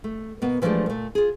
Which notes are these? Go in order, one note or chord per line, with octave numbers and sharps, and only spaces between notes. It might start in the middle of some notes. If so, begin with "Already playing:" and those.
A3
B2 A#3 B3
E3 F3 G#3 A3 D4 G4
A#2 A3
F4 G#4